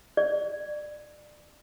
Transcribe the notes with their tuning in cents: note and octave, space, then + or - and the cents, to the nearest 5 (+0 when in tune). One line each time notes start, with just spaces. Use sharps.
D5 +25